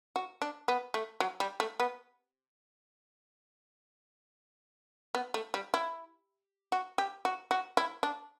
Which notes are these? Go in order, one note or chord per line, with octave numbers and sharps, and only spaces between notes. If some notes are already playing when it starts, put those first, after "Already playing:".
F#4
D4
B3
A3
F#3
G3
A3
B3
B3
A3
G3
E4
F#4
G4
F#4
F#4
E4
D4